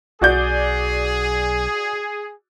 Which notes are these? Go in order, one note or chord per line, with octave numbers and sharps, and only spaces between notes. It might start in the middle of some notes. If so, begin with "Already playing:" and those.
B1 F#4 G#4 D5 G6